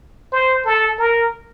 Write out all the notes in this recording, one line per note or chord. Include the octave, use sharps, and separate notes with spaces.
C5
A4
A#4